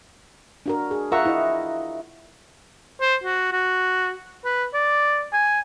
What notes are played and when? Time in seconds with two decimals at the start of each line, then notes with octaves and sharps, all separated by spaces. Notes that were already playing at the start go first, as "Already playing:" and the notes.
0.66 D4 F#4 A#4
0.91 G#4
1.12 F4 A#4 E5 F#5 A#5 C#6
1.25 E4 D#5
3.01 C5
3.24 F#4
3.52 F#4
4.45 B4
4.74 D5
5.33 G#5